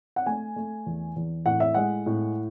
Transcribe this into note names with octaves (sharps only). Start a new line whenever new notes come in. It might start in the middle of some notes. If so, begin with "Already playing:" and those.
F#5
A3 G#5
A3
E2
E2
A2 F#5
E5
G#3 F#5
A2